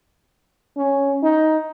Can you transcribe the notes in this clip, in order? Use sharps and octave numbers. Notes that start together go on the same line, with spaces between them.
C#4
D#4